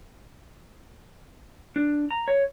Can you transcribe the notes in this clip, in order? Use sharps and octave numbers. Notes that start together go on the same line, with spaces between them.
D4
A#5
C#5